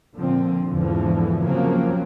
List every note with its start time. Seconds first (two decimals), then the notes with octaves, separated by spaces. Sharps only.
0.15 A#2 D3 F3 C4
0.69 E2 G#2 D3 E3 F3
1.45 C#3 F3 F#3 A#3 C4